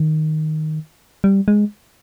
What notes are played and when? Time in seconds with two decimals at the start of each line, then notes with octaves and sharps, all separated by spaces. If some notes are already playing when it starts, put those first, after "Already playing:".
Already playing: D#3
1.24 G3
1.48 G#3